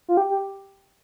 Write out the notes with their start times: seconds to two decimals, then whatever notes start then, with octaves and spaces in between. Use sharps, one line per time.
0.08 F4
0.17 G4
0.30 G4